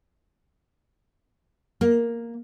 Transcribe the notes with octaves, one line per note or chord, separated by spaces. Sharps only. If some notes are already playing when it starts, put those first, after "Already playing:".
A#3